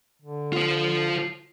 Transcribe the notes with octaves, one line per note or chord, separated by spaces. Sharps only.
D3
F4 C5